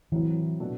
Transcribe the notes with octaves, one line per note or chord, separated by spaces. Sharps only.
A2 E3 F#3 C4 E4
B2 A3 D4 F#4 A4